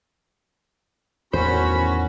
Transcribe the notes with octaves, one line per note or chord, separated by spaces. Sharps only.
E2 A2 D#3 C#4 F#4 C5 B5